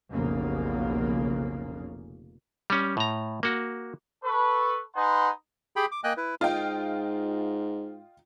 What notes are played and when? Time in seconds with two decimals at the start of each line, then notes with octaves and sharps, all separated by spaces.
0.12 F1 B1 C#3 A#3
2.70 G3 C#4
2.97 A2 A#5
3.43 A#3 F#4
4.24 A4 B4 C#6
4.95 D#4 B4 F#5 G#5 B5 C6
5.76 G4 G#4 G5 B5
5.92 D6
6.04 A#3 D#5 G5 G#5 F#6
6.17 E4 B4
6.41 G#2 F4 D#5 G5